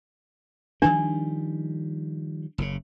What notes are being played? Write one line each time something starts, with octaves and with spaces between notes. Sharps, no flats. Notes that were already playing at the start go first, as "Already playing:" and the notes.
D#3 F3 G3 D4
F#1 A#2 C#3